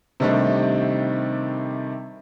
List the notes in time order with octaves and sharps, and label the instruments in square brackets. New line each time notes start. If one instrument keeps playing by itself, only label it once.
[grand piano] C3 D#3 G3 A3 D4 D#4